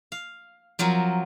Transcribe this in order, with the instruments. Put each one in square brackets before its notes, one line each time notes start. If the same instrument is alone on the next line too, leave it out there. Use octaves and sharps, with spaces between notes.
[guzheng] F5
F3 F#3 C4 A#4